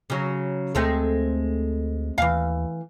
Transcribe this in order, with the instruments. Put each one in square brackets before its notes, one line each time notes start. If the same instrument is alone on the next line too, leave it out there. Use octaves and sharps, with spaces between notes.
[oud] C#3 F#3
[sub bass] D2 [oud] G#3 A3 C4
[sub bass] D#2 [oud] E3 F5